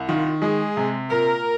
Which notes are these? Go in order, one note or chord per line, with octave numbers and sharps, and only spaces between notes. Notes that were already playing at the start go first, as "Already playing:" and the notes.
Already playing: C2
D#3 F4
G#3 G#4
C3
A#2 A#4